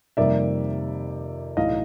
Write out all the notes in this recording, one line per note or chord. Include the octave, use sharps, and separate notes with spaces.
F2 C3 D#3 G3 A#3 D5 E5
B1 A2 E3 D#5 F5